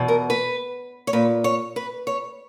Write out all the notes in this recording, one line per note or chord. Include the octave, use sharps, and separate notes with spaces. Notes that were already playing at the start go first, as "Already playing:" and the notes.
Already playing: E2 B2
A#4
B4
C#5
A#2 B4
C#5
B4
C#5